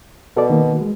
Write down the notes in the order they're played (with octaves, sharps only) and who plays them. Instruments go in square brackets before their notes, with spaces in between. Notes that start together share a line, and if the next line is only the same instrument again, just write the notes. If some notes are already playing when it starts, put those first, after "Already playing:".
[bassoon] B2 [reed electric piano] A4 D5
[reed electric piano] D#3 A#3
G#3